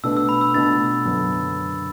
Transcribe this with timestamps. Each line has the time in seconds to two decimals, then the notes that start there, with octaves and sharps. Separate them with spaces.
0.03 B2 A3 D4 B4 E6
0.17 E6
0.29 B5
0.41 E6
0.54 B2 A3 D4 B4 A6
1.05 F#2 D3 B3 D4 A4